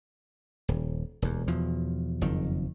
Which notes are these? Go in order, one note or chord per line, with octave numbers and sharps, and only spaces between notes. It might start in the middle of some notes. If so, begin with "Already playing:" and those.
D#1
E1 D#2
E2 B2 F3
F#1 F2 D#3